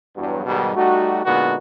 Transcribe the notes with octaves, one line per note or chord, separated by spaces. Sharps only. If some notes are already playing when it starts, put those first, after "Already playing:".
E2 G2 F#3
G#2 B2 D#3 G3
G3 A3 D#4 F#4
A#2 D3 G#3 B3 D#4 F#4